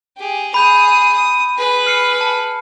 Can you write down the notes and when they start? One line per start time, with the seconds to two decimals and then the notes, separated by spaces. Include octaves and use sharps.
0.17 G4 G#4
0.54 G#4 B5 D#6 G6 F7
1.14 D#6
1.57 G#4 B4
1.86 F6 C7 C#7
2.18 A5 C#7